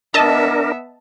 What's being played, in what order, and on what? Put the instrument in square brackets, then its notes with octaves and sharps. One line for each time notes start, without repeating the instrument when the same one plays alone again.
[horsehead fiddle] B3 E5 [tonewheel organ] D4 A#4 [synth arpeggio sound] D#5 A5